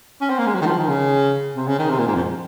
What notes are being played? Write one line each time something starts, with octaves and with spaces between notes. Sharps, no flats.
C#4
C4
A#3
G#3
F#3
D#3
F3
D#3
C#3
C3
C#3
D#3
C3
A#2
G#2
F2